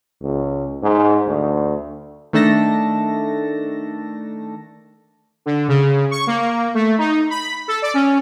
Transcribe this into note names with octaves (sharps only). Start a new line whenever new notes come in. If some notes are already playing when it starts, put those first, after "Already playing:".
C#2
G#2
D2
D#3 A3 D4 A4 A5 A#6
D3
C#3
C#6
A#3
A3
D#4
B5
A4
D5
C#4